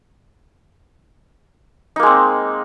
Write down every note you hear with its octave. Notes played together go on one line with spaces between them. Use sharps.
G#3 A#3 C4 D#4